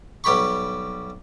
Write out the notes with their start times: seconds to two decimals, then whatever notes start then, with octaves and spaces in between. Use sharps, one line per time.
0.24 B1 G3 G4 B5 C#6